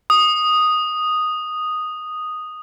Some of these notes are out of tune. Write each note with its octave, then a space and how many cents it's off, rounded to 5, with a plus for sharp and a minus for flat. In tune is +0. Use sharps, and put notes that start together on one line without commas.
D#6 -5